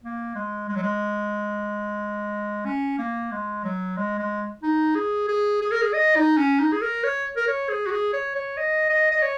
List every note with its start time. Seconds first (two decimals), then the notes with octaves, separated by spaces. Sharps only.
0.03 A#3
0.35 G#3
0.69 G#3
0.76 F#3
0.83 G#3
2.65 C#4
2.99 A#3
3.31 G#3
3.64 F#3
3.97 G#3
4.19 G#3
4.63 D#4
4.95 G#4
5.28 G#4
5.61 G#4
5.71 A#4
5.81 G#4
5.94 D#5
6.16 D#4
6.38 C#4
6.60 D#4
6.72 G#4
6.81 A#4
7.04 C#5
7.36 A#4
7.48 C#5
7.69 G#4
7.86 F#4
7.91 G#4
8.13 C#5
8.35 C#5
8.57 D#5
8.89 D#5
9.11 D#5
9.22 C#5